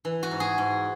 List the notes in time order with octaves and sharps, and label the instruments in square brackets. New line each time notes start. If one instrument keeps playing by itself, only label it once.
[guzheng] E3
F#4
G#2
G#4
G#2